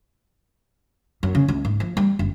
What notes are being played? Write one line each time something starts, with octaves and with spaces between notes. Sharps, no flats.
F#2
C#3
C#2
G#2
F3
G3
F#1